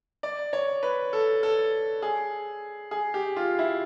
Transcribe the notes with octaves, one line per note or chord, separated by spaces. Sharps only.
D5
C#5
B4
A4
A4
G#4
G#4
G4
F4
E4